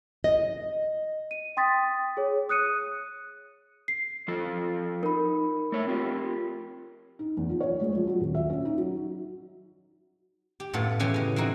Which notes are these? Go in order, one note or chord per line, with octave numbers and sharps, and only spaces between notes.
D#5
D#7
G5 C6 D#6 A6 B6
G#4 C#5
D#6 F#6 C#7 D#7
C7
F3 F4 A4
D#4 A#4 B5
A3 C#5 E5
C4 F4 G4
D#4
E2
F3
C#5
G#3
F3
F#3
D#1
E5
C#4
D#4
F#3
G4
F#2 A2 B3 F4 A4
C#3 E3 C#4 G4 B4
C#4 D#5
E3 C4 D#4 F#4